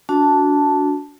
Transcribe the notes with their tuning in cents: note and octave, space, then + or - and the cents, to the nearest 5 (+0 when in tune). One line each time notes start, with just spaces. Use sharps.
D4 -25 F#4 -10 A5 +0